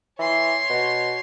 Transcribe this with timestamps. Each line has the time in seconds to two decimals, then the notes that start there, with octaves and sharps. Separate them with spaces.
0.19 E3 C#5 C6
0.70 B2